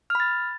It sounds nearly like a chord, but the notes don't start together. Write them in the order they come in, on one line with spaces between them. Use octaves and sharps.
F6 B5 A6